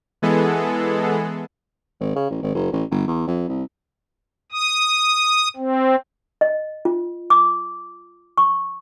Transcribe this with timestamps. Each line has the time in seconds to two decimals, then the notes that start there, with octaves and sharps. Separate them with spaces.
0.22 E3 G#3 B3 G#4 A4
2.00 G#1
2.16 C#3
2.30 A1
2.43 G#1
2.54 F#1
2.72 A1
2.91 G1
3.07 E2
3.27 F2
3.48 C2
4.52 D#6
5.57 C4
6.41 D#5
6.85 F4
7.30 D6
8.38 C#6